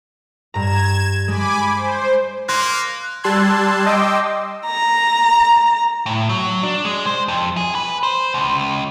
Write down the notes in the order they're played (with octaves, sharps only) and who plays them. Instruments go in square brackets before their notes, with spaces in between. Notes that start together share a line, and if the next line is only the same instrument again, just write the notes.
[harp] G2 A#5 [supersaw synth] G#6 E7
[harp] G#3 [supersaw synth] G#5 B5 D6
[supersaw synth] C5
[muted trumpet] A#3 [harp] C6 A#6 [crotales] F#6
[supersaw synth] G3 A5 C6 E6 F#6 G#6
D#5 G5 C6 D6 E6
[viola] A#5
[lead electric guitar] A2
F#3
D4
G#3
C5
F2
G#4
B4
C5
C#2